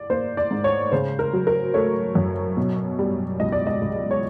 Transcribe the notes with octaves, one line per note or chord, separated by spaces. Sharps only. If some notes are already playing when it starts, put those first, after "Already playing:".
Already playing: D5
A#3 C5
D5
G#2
C#5
C#3 C5
A#4
F#3
A#4
A3 C#5
F#2
B2
G3
C#2 D#5
D5
D#5
C#2
C#5